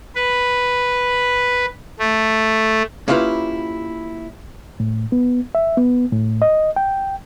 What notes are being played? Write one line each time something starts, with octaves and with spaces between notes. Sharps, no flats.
B4
A3
A#3 C#4 E4 F4 G4 B4
A2
B3
E5
B3
A2
D#5
G5